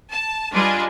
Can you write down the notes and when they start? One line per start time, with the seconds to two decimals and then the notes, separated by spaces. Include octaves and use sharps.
0.11 A5
0.53 G3 D4 F4 G#4 B4 D#5